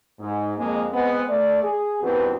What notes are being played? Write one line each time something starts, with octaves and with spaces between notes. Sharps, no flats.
G#2
F2 G#3 A#3
G#3 B3 C4
A3 D5
G#4
E2 G2 A#2 C4 F#4 B4